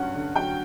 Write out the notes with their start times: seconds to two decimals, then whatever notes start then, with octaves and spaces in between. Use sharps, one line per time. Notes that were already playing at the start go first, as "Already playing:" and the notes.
Already playing: G2 F#3 C#4 F#5
0.15 D3
0.35 F#3 G5